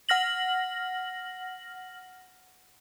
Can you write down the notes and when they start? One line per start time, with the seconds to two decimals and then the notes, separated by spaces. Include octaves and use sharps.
0.09 F#5 F6 A#6 F#7